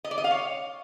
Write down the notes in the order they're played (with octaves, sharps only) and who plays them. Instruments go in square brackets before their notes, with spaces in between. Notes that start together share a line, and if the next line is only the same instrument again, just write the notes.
[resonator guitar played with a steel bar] D#5
D5
D#5
F5
C#5